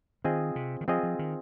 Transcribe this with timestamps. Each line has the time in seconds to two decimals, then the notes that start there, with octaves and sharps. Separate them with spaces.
0.24 D#3 C4 F4 G#4 D#5
0.56 C3
0.81 D#3
0.88 F3 C4 F4 G#4 D#5
1.03 F3
1.19 D#3